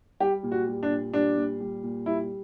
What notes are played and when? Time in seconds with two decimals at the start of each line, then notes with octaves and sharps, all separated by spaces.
0.20 G3 G4
0.43 A#2
0.52 F#4
0.67 G3
0.83 D4
0.90 A#2
1.13 G3 D4
1.37 A#2
1.60 G3
1.83 A#2
2.06 G3 E4